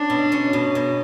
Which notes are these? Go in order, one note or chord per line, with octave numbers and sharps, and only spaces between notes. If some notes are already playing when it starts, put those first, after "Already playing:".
Already playing: C#4 D4
B2
C#4
B2
B2